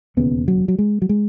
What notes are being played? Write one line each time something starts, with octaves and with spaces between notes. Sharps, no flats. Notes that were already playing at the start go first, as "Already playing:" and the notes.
E1 D#2 C#3 B3
F#3
F#3
G#3
F#3
G#3